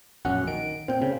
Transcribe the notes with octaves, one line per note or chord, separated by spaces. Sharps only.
A#1 F#2 C#4 F#5
D#3 D7
A#2 C4 G5
C#3